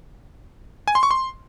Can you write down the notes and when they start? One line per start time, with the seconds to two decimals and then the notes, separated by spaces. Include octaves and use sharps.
0.88 G#5
0.95 C6
1.03 C#6
1.11 C6